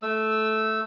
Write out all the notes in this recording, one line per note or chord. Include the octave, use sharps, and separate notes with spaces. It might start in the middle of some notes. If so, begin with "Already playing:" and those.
A3 E6